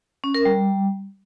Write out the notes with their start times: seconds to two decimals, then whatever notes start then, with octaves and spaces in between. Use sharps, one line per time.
0.24 C#4
0.34 A#4
0.45 G3